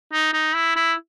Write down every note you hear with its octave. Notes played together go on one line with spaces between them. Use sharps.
D#4
D#4
E4
E4